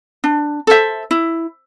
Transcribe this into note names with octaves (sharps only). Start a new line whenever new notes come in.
D4
A4 C5 E5
E4